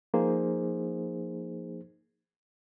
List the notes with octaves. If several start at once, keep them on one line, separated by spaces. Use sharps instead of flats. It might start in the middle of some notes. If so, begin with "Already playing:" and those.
F3 A#3 D#4 G#4 C5